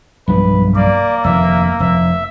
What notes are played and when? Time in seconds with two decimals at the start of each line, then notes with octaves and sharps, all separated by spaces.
0.28 B1 G2 F3 B4
0.75 A#3 D5
1.25 F1 D#2 E5
1.80 F1 E5